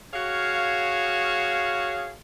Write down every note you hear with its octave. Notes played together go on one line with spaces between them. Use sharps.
F#4 G#4 C#5 F5